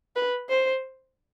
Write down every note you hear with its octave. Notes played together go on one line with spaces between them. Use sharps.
B4
C5